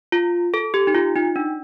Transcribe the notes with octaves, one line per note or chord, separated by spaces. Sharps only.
F4
A4
G4
D#4
F4
D#4
D4